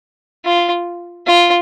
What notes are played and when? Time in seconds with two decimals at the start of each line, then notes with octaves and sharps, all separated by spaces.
0.45 F4
1.27 F4